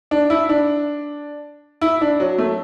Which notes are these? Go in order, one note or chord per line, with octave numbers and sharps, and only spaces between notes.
D4
E4
D4
E4
D4
F#3
A3